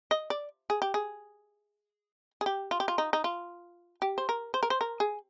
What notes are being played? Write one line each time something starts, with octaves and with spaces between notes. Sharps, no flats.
D#5
D5
G#4
G4
G#4
G#4
G4
F4
G4
F4
D#4
D#4
F4
G4
C5
A#4
C5
A#4
C5
A#4
G#4